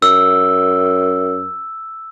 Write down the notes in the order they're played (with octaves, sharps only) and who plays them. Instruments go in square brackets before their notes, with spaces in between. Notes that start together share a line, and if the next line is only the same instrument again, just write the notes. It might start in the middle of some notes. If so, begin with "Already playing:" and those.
[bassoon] F#2 [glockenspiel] E6